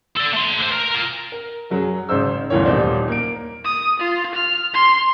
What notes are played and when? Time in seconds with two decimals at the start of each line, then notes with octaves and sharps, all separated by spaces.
0.17 A4 D5
0.33 A3 C6
0.59 D3 C5
0.72 A#4
0.91 F4 A#4
1.32 A#4
1.70 F#2 F#3 G#4
2.09 G#1 C#3 D#4 C5 E6
2.50 G1 D2 E3 A#4 C#5
2.65 D#1 F#2 D#4 C5 D5
3.08 A#3 D7
3.64 D#6
4.00 F4
4.35 F6
4.74 C6